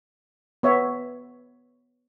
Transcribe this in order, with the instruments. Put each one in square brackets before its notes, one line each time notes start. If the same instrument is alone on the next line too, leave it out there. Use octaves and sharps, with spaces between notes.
[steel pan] B3 C#5 E5